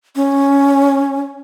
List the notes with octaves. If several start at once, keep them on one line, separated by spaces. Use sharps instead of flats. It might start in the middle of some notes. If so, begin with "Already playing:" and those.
C#4